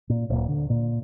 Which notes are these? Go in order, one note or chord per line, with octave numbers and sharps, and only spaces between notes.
A#2
D1 A#2
D3
A#2